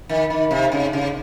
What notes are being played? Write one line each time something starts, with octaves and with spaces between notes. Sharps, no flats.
D#3
D#3
C3
C#3
C#3